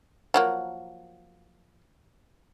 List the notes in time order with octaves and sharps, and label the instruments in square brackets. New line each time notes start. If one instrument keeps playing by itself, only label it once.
[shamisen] F3 F#3 A#3